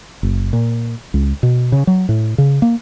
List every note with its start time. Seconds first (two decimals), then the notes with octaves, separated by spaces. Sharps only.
0.23 F#1
0.53 A#2
1.14 C#2
1.43 B2
1.72 C#3
1.87 F#3
2.09 A2
2.38 C#3
2.62 A#3